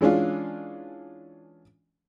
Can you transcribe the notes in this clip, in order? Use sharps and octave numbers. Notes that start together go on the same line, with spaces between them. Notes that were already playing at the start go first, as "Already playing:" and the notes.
E3 G#3 C#4 D4 F4